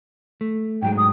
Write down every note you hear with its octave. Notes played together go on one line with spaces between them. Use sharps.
A3
G#2 F#3 G#3 G5
D#6